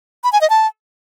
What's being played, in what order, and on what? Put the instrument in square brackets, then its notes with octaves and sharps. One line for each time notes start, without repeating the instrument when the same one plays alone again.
[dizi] B5
G#5
D#5
A5